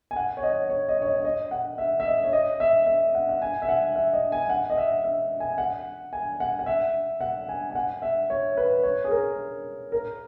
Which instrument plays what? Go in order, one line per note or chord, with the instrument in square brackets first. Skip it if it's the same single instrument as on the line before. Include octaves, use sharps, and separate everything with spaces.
[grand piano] G#5
F#5
C#5
D#5
C#5
D#5
C#5
D#5
C#5
D#5
F#5
E5
E5
D#5
C#5
D#5
E5
E5
F#5
F#5
G#5
E5
F#5
E5
D#5
G#5
F#5
D#5
E5
E5
G#5
F#5
G#5
F#5
F#5
E5
F#5
G#5
G#5
F#5
E5
C#5
B4
C#5
G#4
A#4
A#4